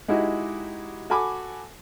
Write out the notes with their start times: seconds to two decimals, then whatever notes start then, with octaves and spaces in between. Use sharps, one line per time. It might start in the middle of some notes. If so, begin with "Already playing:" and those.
0.08 G#3 D#4 E4 F#4 G4
1.10 F#4 A4 G#5 B5 D6